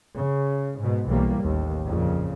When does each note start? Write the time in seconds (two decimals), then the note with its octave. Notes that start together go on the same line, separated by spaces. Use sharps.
0.14 C#3
0.79 G#2 B2
1.09 B1 E3 G3 A#3
1.41 A1 D#2
1.87 F2 A#2 C#3